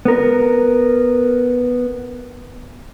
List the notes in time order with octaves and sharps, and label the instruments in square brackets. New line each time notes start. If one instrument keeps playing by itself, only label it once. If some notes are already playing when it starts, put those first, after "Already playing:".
[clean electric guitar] B3 A#4